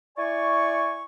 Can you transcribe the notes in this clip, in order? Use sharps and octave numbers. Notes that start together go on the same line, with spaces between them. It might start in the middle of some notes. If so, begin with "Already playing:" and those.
E4 D5 G#5 C#6